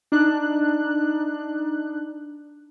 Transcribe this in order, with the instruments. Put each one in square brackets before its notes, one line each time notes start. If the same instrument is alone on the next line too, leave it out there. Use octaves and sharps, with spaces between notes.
[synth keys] D4 D#4 F#6